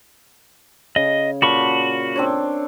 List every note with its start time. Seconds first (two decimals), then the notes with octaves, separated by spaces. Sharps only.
0.96 C#3 D#5
1.42 A#2 F#4 A5 B5 C#6
2.16 C4 D4 C#5